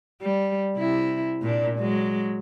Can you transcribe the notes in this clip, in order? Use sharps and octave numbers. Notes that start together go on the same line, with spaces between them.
G3
C3 E4
A#2 D4
F#3 G#3